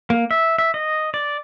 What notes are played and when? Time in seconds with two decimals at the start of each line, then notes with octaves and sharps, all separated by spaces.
0.10 A#3
0.31 E5
0.58 E5
0.74 D#5
1.14 D5